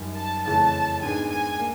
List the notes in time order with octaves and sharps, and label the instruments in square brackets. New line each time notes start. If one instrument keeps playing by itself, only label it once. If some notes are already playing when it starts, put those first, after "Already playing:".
Already playing: [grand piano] F#2 D#3 G3
[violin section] A5
[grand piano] F2 C#3 E3 A3 C#4 [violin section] A5
[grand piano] G#2 D#3 G#3 B3 D4 [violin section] G#5
[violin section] G#5
[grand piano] A#3